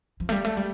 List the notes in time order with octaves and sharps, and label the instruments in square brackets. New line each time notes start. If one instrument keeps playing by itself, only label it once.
[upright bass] F3
A3
G3
A3
G3